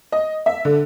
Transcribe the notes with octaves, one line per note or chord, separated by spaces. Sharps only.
D#5
E5
D3